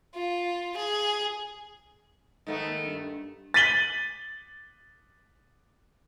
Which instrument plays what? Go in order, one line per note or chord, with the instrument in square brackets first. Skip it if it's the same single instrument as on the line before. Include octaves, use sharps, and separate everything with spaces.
[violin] F4
G#4
[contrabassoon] G#2 [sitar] D#3 A3 B3
[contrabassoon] D#2
G2
[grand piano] A6 B6 D#7 F#7 G7